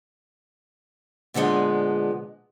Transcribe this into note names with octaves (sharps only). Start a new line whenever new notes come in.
A#2 D3 F3 G#3 B3